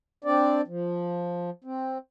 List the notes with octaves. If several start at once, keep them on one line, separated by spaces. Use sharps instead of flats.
C4 D4 D5
F3
C4